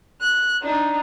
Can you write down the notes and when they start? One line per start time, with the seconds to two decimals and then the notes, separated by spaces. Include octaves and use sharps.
0.20 F#6
0.62 D4 D#4